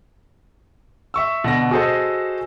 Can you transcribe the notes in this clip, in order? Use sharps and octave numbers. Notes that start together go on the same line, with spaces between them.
E5 C#6 E6
B2 D3 A#6
F#4 G#4 A4 C5 D#5